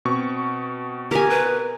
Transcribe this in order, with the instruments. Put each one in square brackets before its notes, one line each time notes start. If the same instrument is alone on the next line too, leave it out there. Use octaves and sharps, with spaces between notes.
[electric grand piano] B2 C4 C#6
[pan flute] G4 [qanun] A#4 G#5
[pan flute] B4